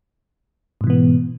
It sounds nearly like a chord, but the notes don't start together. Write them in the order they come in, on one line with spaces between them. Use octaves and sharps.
G#2 B2 E3 B3